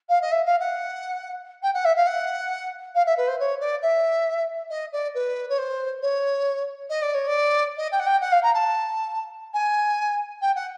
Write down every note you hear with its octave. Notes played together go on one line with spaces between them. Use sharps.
F5
D#5
E5
F5
F#5
G5
F#5
E5
F5
F#5
F5
E5
B4
C5
C#5
D5
E5
D#5
D5
B4
C#5
C5
C#5
D#5
D5
C#5
D5
D#5
G5
F#5
G5
F#5
F5
A#5
A5
G#5
G5
F#5